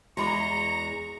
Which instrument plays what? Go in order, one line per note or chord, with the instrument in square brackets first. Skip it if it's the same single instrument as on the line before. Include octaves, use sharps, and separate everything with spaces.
[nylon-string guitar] E2 G#3 [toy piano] F#4 B5 D6 [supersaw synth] A#5 [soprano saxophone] C#6